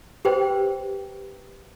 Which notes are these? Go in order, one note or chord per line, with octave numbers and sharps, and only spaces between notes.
G4 B4 C5 G5